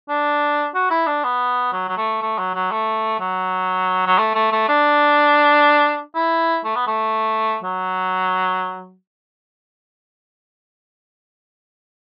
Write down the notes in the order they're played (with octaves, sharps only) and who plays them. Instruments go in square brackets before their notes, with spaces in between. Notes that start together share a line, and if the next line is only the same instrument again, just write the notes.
[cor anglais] D4
F#4
E4
D4
B3
F#3
F#3
A3
A3
F#3
F#3
A3
F#3
F#3
A3
A3
A3
D4
E4
A3
B3
A3
F#3